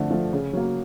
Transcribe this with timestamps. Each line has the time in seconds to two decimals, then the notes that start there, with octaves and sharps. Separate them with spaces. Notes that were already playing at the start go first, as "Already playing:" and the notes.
Already playing: D3 F3 A3
0.11 F3 A3
0.33 C#3
0.53 F#3 A#3